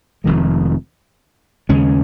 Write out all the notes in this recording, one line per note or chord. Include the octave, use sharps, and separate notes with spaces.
F1 F2 D#3 G#3
D#2 C#3 G#3 C#4